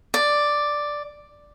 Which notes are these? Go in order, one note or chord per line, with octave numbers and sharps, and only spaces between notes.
D5